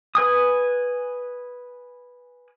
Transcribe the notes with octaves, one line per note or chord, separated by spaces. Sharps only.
B4 G#5 D#6